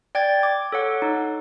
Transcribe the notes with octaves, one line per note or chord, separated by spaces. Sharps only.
D5 G5 G#6 A6
D6
A4 C#5 F#5
D#4